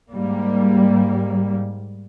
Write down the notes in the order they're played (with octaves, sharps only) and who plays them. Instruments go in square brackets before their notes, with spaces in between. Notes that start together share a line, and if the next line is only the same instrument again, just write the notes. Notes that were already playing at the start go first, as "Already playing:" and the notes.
[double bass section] G#2 G3 A#3